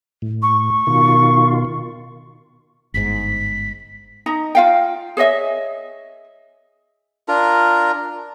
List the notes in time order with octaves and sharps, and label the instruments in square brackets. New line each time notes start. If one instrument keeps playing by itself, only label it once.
[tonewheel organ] A2
[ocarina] C#6
[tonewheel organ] B2 D#3 F4
[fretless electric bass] G1 G#2 [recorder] B6
[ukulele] D#4 D#5 A#5
F4 F5 G5
G#4 C#5 D#5 E5
[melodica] D4 F4 A#4 A#5